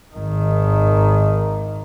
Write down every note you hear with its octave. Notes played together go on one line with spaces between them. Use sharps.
G#1 D#3